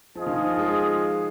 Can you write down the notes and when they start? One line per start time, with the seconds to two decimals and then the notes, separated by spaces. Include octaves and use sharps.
0.15 F3 F4 G#4 D#5
0.26 D#3
0.38 F3
0.49 F3
0.59 G#3